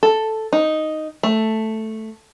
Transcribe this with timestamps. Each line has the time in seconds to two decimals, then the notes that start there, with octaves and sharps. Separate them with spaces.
0.03 A4
0.53 D#4
1.23 A3